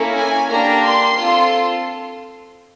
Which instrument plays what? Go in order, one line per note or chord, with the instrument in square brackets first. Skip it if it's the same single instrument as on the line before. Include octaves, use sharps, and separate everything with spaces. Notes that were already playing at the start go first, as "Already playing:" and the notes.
Already playing: [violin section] A#3 C#4 E4 A4
G#5
A#3 D4 G4 A#5
C6
C4 F4 A4